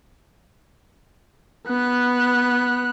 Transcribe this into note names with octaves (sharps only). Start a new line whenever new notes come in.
B3 F#6